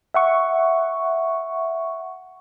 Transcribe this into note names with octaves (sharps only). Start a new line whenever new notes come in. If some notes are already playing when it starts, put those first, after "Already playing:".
E5 F#5 C#6